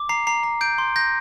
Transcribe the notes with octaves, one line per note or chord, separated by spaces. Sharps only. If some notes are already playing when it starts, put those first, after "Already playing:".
Already playing: D6
A#5 C7
A#5 C7
A#5
G6 D7
C6
G6 A#6